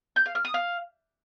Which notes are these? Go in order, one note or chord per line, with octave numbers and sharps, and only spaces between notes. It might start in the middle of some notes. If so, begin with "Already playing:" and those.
G6
F5
F6
D#6
F5